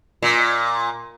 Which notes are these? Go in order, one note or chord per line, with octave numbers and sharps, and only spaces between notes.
A#2